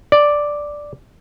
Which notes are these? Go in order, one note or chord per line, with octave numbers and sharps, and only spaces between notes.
D5